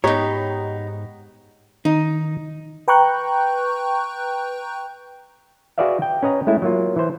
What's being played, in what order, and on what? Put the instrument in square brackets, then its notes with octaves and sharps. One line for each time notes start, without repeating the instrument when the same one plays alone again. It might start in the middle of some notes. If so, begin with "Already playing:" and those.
[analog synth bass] G#2 [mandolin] B3 D#4 [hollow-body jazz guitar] G4 C#5 [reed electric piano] D#5 A#5
[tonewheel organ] D#3 [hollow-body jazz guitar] D#4
[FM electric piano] B4 G5 A#5 C#6 F#6 G6
[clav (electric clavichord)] F#4 G#4 B4 D5 E5 F5
G5
C#4 B4 D#5 A#5
G#3 A3 E4
F#3 A#3 F4
E3 B4 C5